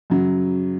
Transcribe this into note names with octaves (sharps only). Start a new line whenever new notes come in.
F#2 C#3 F#3